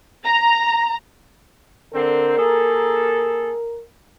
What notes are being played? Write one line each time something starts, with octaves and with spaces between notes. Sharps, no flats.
A#5
D3 C4 A#4
A#3 G#4 A4